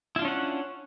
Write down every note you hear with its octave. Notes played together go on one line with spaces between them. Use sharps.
C#4 D4 E4 F4 F#5